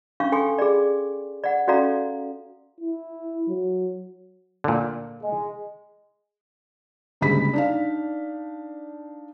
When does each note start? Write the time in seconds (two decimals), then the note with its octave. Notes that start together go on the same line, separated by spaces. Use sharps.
0.20 C#4 D4 F5 C#6
0.32 A4 G5 G#5 C6 C#6
0.58 G#4 D5
1.44 D5 F#5
1.68 C#4 F#4 A4 D5 F5 A#5
2.81 E4
3.49 F#3
4.64 A#2 D3
5.22 G#3
7.21 F#1 D2 G#2 G3 B5 B6
7.53 D4 D#4 F5